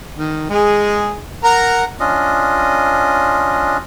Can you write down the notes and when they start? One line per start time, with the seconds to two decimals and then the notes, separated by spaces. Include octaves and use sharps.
0.15 D#3
0.50 G#3 G#4
1.44 A#4 F#5 A#5
2.00 C#4 D4 F4 D#5